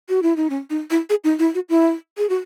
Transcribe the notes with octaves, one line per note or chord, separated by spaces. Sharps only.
F#4
E4
D#4
C#4
D#4
E4
G#4
D#4
E4
F#4
E4
G#4
F#4